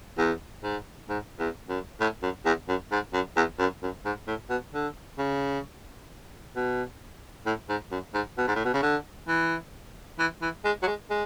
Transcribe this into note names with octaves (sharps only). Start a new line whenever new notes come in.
E2
G#2
G#2
E2
F#2
A2
F#2
E2
F#2
G#2
F#2
E2
F#2
F#2
G#2
A2
B2
D3
C#3
B2
A2
G#2
F#2
G#2
B2
G#2
A2
B2
C#3
D3
E3
E3
E3
G#3
F#3
G#3
G#3